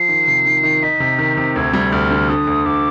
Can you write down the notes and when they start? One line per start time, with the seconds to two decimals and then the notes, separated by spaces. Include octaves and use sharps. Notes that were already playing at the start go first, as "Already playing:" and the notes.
Already playing: F3 C7
0.09 D#3
0.28 C3
0.46 D#3
0.63 D#3
0.82 D#4 B6
1.00 C3
1.19 D#3
1.37 C3
1.56 D2 G#6
1.73 G3
1.92 D2 F6
2.10 D3
2.29 D3 D#6
2.47 D2
2.66 D2 D6